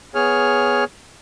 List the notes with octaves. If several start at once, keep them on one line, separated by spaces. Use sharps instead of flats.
B3 G#4 C#5 F6